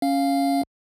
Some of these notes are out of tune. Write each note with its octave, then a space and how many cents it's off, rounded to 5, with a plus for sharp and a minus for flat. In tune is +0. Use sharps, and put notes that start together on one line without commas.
C#4 +0 F5 +0